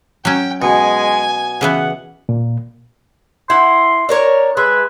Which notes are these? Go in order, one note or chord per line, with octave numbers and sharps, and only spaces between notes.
F#3 C#4 G5
B2 G#3 G#5
C#3 E3 B3 F#5
A#2
E4 F#5 C6
D4 A#4 C#5
G#3 B4 E5